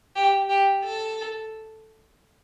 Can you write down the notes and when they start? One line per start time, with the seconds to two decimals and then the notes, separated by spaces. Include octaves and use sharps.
0.16 G4
0.49 G4
0.84 A4